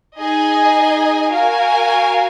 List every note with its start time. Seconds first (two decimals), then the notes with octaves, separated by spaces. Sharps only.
0.18 D#4 G#4 D#5 G#5
1.31 F#4 A#4 F5 G#5